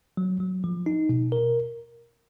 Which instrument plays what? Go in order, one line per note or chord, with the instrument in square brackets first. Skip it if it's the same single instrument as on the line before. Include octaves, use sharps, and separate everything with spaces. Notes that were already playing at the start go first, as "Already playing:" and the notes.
[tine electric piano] F#3
F#3
F3
D#4
B2
A#4